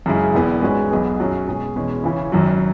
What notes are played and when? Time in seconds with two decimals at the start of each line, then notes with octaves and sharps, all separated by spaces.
0.06 F#2 C#3 G#3 E4 G#4
0.34 E1 E2 E3 B3
0.62 G#2 G#3 C#4 F#4 B4
0.91 B1 B2 B3 G#4
1.20 F#2 F#3 C#4 G#4
1.47 B2 G#3 C#4 G#4
1.76 E2 B2 G#3 C#4
2.03 C#3 E3 C#4
2.32 G#1 F#2 F#3